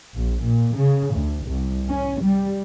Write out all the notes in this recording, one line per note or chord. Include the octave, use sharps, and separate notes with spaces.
A#1
A#2
C#3
D2
C2
C#4
G3